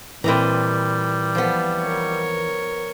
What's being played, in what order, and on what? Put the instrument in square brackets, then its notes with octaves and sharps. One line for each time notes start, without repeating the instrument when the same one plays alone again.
[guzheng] A#2 D#5 A#5 [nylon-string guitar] E3 C4 B4 [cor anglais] G3
[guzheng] F3 B3
[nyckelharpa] A#4 C#5